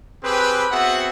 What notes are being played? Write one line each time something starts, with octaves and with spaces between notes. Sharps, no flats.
C4 G4 G#4 B4
B3 C4 F#4 G#4 E5 F#5